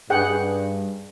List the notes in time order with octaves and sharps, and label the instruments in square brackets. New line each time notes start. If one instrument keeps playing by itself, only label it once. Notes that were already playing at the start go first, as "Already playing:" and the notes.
[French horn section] G2 [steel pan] G#4 F#5 G5